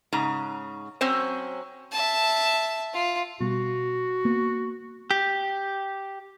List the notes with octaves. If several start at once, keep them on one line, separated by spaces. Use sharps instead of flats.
G#2 C#3 A#5
F#3 C4 C#4 C5
E5 A5
F4
B2 G3 F#4
A#3 B3
G4